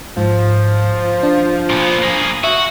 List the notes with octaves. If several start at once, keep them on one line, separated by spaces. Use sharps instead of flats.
G#2 F3
D4
A#2 B3
A#3 G#4
F#4 E5